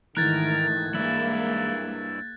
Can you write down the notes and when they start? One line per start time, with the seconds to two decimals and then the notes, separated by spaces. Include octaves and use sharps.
0.17 G#2 D#3 E3 A3 A#4 F#6 G#6 A6
0.95 G2 G#3 A#3 E4